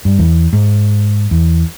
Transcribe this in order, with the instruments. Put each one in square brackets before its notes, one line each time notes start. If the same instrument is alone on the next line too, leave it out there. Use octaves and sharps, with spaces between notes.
[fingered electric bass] G2
E2
G#2
E2